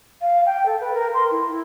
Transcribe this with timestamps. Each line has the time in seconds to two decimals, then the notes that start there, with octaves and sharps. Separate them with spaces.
0.22 F5
0.46 G5
0.66 A4
0.81 B4
0.94 A#4
1.14 C6
1.31 E4
1.51 E4